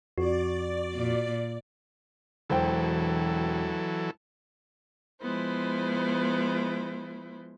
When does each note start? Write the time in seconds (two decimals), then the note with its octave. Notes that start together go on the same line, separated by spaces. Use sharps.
0.18 F2 F#4 D5
0.95 A#2
2.50 E1 E3 F#3 A4 C5 G5
5.21 F3 G#3 B3 E4 C5